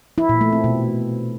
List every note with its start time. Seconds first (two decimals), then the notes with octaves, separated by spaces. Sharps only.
0.18 E4
0.29 A#2
0.41 A3
0.52 C4
0.64 B2